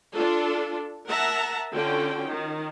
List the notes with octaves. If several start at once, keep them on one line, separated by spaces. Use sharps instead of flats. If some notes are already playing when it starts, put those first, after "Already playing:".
D4 F4 A4
A#4 E5 F#5 A5 A#5
D3 C#4 F4 F#4 G5
D#3